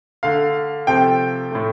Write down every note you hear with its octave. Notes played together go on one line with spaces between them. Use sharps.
D3 A3 F5
C3 F3 A3 G5
A2 A3